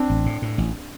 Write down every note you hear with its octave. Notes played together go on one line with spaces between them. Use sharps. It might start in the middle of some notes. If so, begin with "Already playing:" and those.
Already playing: C4 D4
A1
A2
A2
A1